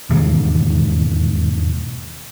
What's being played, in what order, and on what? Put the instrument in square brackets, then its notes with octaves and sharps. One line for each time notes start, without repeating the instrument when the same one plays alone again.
[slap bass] E1 D#2 G#2 C#3